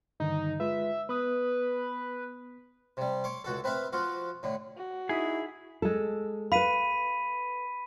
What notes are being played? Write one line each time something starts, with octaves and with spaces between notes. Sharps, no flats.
G2 D3 D#3 D#4
G#3 F4 B4 E5
B3 B4 D#6
C3 G3
C#5 C6 D6
C#2 F#4 A4
C4 B4 C5 E5 F5
F3 F4 F#4
A2 D3
F#4
D#4 E4 G#4 D#6 B6
G#3 A4
B4 F5 B5 B6 D#7